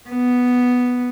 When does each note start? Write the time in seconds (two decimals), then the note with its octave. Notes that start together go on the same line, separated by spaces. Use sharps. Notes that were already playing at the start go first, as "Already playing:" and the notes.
0.10 B3